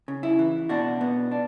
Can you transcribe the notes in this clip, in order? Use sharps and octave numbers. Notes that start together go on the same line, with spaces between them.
C#3
E4
E3
B2 D4 F#4
B3
D4